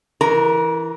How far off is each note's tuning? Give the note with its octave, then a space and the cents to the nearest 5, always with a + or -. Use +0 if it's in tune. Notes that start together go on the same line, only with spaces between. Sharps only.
E3 +0 A#4 +0 A#5 +40